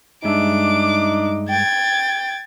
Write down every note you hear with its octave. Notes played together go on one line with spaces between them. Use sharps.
G2 G#3 D4 D#4 E5 D6
G5 G#6 A6